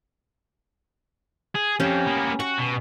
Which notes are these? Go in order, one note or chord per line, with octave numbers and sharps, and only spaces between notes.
G#4
F2 F3 C#4 G4
A#3 B3
F#4 C#6
B2